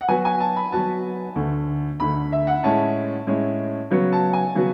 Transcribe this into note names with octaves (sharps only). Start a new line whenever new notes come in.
F#5
F#3 B3 F#4 B4 G#5
G#5
A5
B5
F#3 B3 F#4 B4 A5
D2 D3 A3
D2 D3 A3 B5
E5
F#5
A2 G#3 C#4 E4 A5
A2 G#3 C#4 E4
C#3 F#3 B3 F#4 C#5
A5
G#5
C#3 F#3 B3 F#4